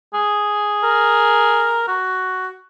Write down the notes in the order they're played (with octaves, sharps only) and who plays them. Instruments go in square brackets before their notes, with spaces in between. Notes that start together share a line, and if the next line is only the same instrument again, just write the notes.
[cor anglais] G#4
[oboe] A#4
F#4